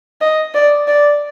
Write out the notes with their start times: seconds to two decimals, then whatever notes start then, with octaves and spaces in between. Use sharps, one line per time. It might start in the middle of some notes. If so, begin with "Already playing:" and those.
0.21 D#5
0.54 D5
0.88 D5